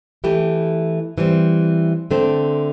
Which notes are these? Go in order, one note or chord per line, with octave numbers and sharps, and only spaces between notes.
E3 A3 E4 G4
E3 G3 C4
D3 A3 C4